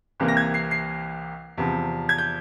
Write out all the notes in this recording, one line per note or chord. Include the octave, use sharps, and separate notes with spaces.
C2 C3 E3 A#3
A#6
G#6
C7
C7
E2 C3 F3
G#6
G6